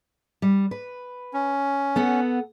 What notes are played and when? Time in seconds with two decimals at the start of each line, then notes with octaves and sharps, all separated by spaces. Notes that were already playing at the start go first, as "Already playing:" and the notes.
0.42 G3
0.71 B4
1.33 C#4
1.96 B3 A4 F#5